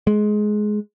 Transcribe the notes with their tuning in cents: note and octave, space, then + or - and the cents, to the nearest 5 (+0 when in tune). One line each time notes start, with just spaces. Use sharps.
G#3 +15